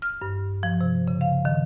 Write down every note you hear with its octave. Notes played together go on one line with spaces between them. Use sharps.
F6
G2
F3
C3
C#3
F5
D#3